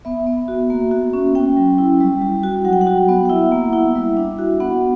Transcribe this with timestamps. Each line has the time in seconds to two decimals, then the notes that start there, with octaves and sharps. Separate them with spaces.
0.05 B3 E5
0.27 B3
0.48 F#4
0.70 A#3
0.91 F#4
1.13 C#4
1.35 C#4 G5
1.57 F#3
1.78 E4
2.00 G3
2.22 G3
2.43 F#4
2.64 F#3 F#5
2.73 G5
2.81 F#5
2.87 F#4
3.09 B3
3.25 F#5
3.30 E4 E5
3.52 A#3
3.73 E4
3.95 G3
4.17 D4
4.39 F#4
4.60 B3 F#5